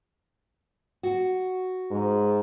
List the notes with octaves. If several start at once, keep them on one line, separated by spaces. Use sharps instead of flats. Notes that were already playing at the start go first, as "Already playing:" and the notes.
F#4
G#2